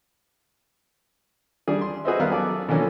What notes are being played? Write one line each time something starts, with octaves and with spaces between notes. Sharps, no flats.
G3 D4 G#4
C6
F#4 G#4 B4 C5 D#5 E5
G3 B3 A#4 F5
F#3 G#4 A4 D5
B2 D3 E3 F3 A#3 C#4